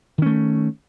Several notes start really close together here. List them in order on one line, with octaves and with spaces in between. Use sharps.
D#3 C#4 A3